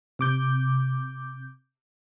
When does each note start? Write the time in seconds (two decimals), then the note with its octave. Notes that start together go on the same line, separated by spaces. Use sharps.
0.19 C3 D6 G6